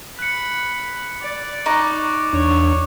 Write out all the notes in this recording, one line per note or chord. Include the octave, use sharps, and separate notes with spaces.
B5 F#6 C#7
D5
D#4 C#6 D6 F#6
E2 D4 C#5